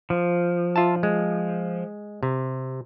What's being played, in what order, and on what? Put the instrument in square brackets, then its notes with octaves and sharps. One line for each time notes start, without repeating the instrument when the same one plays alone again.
[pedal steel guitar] F3
[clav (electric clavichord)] F4 E5 A5
G#3
C3